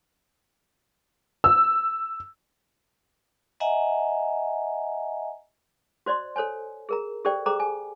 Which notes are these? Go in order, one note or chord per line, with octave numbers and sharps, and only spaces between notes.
E6
D#5 E5 F#5 G#5 A#5
F#4 C5 D5 D#5 C6
A4 C5 C#5 G#5
G#4 A#4 A#5
G4 A4 C5 D5 G5
G#4 A4 C5 G5 A#5 D6
G#5